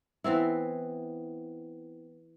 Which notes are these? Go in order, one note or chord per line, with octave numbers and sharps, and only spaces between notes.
E3 B3 C4 E4